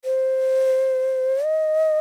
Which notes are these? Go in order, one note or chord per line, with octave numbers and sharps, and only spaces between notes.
C5
D#5